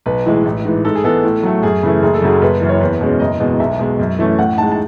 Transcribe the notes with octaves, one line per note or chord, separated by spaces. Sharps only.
B1 B4
A2 E3 G#3
A1
G#2 E3
G#2 A4
G#4
E3 G#3 B3 A4
A2
F#3 A3
F#2 G#4
C#3 E3 A3
F#1 G#4
A4
F#2 C#3 F#3 G#4
F#1 B4
F#2 E3
C#5
E2 B4
B2 G#3 C#4
F#1 D#5
E2 B2 G#3
B1 E5
B2 G#3
F#2
E3 A3 C#4
A2 F#5
G#3 D#4 A5
A5